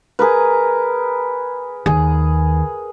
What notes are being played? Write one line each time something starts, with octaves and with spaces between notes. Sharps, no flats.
G#4 A#4 B4
D#2 G#4